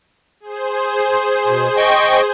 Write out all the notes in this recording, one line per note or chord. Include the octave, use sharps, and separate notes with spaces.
G#4 C5
B2
D#5 G5 C#6